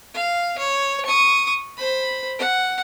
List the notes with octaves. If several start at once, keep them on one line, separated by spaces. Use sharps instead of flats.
F5
C#5
C#6 D#6
C5 B5
F#5